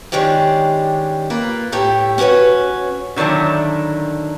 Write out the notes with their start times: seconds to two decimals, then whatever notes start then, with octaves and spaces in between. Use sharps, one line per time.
0.12 D#3 G#3 C#4 D4 G4
1.30 A#3 F4 B4
1.72 A2 A3 G4
2.18 C#4 F#4 G#4 B4 C#5
3.16 D3 D#3 F#3 D4 E4